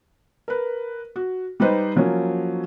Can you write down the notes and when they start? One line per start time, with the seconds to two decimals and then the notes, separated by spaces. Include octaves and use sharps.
0.48 A#4 B4
1.16 F#4
1.60 G3 D#4 G4 B4 C5 D#5
1.96 F3 F#3 A#3 C#4